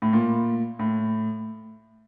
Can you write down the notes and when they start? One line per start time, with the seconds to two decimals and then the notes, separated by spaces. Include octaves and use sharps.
0.02 A2
0.13 A#2
0.79 A2